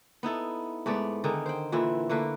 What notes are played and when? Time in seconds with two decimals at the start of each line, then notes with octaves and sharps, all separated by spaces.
0.23 B3 D#4 E4 A4
0.86 G#2 A3 B3 D5
1.24 D3 D#3 D#4 G#4
1.46 C5 G5
1.72 A#2 D3 E3 E4
2.10 D3 A3 A#3 B4